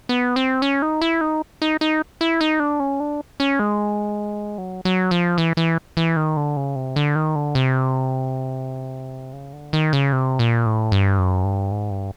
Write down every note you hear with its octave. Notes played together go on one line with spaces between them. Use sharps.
B3
C4
C#4
D#4
E4
D#4
D#4
D#4
E4
D#4
D4
C#4
D4
C#4
G#3
F#3
F#3
F3
E3
E3
E3
D#3
D3
C#3
C3
D3
D#3
D3
C3
C#3
D3
D#3
C#3
C3
A#2
A2
G2
F#2
G2
G#2
G2